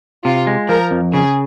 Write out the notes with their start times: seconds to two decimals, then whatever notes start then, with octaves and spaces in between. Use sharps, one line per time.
0.25 C3 F4
0.47 G#3
0.69 F3 A#4
0.91 F2
1.13 C#3 G#4